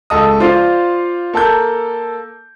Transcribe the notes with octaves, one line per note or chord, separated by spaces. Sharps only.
C#2 A4 D#5 D#6
F4 C5 D5 F5
A#3 A4 A5 G6